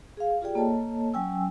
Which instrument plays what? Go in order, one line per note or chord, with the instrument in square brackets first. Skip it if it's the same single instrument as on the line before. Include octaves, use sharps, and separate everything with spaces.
[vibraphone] G#4 F5
F4 G4 G#4 D5 G5
A#3 A4 C#5 D#5 A5
F#3 C#4 G5 G#5 E6